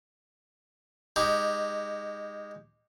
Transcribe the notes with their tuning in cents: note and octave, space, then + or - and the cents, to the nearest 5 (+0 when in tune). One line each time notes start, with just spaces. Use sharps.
G#3 -20 D#4 +0 G4 +0